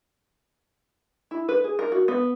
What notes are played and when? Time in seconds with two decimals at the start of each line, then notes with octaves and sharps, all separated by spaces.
1.31 E4
1.49 B4
1.64 G#4
1.79 A#4
1.92 F#4
2.08 B3